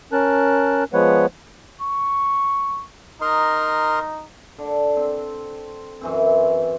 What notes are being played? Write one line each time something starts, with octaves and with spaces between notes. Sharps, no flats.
C#4 A#4 A5 F#6
F3 G#3 B3 B4 C#5 F#5
C#6
D#4 A#4 D#5 C6
D3
C4
F#2 E3 C4